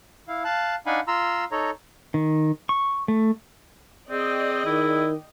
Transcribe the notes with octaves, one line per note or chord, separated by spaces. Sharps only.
E4 F5
F5 A5 F#6
D4 D#4 F5 F#5 G#5 B5
F4 A#5 C6 E6
D#4 A4 C#5 A#5
D#3
C#6
A3
C4 G#4 D5 D#5 G5
D#3 E4